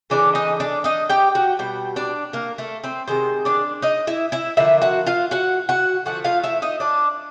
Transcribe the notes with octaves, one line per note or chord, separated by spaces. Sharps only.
C#3 E3 A3 D4 D5
D#4 D#5
D4 D5
D#4 D#5
G4 G5
F#4 F#5
B2 G3 G5
D4 D5
A#3 A#4
A3 A4
C4 C5
C3 D#3 G#3 C5
D4 D5
D#4 D#5
E4 E5
E4 E5
D3 F3 A#3 E4 E5
F#4 F#5
F4 F5
F#4 F#5
F#4 F#5
D3 F3 A3 F#4 F#5
F4 F5
E4 E5
D#4 D#5
D4 D5